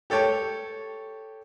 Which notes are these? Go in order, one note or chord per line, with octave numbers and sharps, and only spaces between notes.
G4 A4 C#5 G5